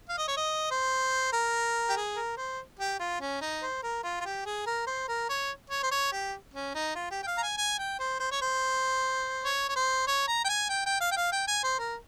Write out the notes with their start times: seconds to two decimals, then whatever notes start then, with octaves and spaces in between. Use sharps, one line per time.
0.09 F5
0.18 D#5
0.28 C#5
0.37 D#5
0.71 C5
1.33 A#4
1.89 G4
1.96 G#4
2.16 A#4
2.38 C5
2.79 G4
3.00 F4
3.21 C#4
3.41 D#4
3.63 C5
3.83 A#4
4.04 F4
4.21 F4
4.25 G4
4.46 G#4
4.67 A#4
4.87 C5
5.09 A#4
5.29 C#5
5.70 C#5
5.83 C5
5.92 C#5
6.12 G4
6.54 C#4
6.75 D#4
6.95 F4
7.11 G4
7.23 G5
7.27 F5
7.38 A#5
7.43 G#5
7.57 G#5
7.79 G5
8.00 C5
8.20 C5
8.32 C#5
8.42 C5
9.45 C#5
9.69 C#5
9.76 C5
10.08 C#5
10.28 A#5
10.45 G5
10.49 G#5
10.69 G5
10.86 G5
11.01 F5
11.11 G5
11.17 F5
11.32 G5
11.48 G#5
11.64 C5
11.79 A#4